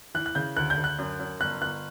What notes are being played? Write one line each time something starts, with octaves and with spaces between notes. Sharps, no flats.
E3 F#6
F#6
C#3 G6
D2 F#6
G6
D2
F#6
F#2
F#2
G1 F#6
G1 F#6